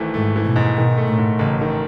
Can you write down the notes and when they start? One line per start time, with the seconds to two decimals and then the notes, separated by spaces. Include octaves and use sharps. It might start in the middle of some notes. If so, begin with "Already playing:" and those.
Already playing: G#1 E3 A3
0.14 G#2 A3
0.36 E3
0.45 B2
0.56 G#2
0.77 B2 D#3
0.98 A3
1.08 A2
1.18 G#2
1.39 A1 C#3
1.61 D#3